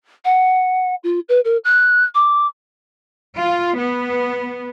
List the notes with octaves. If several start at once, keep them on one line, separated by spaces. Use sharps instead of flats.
F#5
F4
B4
A#4
F#6
D6
F4
B3